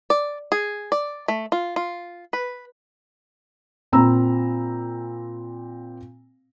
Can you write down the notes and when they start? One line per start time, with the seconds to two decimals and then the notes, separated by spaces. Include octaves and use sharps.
0.10 D5
0.52 G#4
0.92 D5
1.28 A3
1.52 F4
1.76 F4
2.33 B4
3.92 A#2 C4 A#5 B5 E6